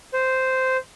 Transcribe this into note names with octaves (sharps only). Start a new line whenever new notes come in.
C5